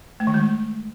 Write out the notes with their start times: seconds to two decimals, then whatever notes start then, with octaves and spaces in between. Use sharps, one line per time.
0.20 A3
0.27 D#3
0.34 G#3